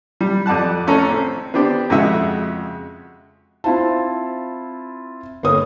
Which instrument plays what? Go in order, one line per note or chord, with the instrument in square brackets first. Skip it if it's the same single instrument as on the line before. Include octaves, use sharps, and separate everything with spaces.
[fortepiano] G3
F2 D5 F#5 A5 F#6
A1 C#4 A4 A#5
C4
B3 C4 D4 G4
F2 C#3 G#3 F#4 E5
[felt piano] C4 E4 F4 C5 A5
G1 A#3 A4 B4 C#5 D#6